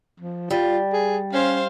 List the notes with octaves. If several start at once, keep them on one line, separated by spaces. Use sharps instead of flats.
F3
G3 F4
G#4
C#4 C5 F5